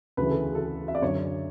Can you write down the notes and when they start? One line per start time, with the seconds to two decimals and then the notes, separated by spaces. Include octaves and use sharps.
0.17 D2 C#3 E3 B4
0.31 A4
0.43 G#4
0.55 A4
0.88 E5
0.95 D5
1.02 F#2 D3 C#5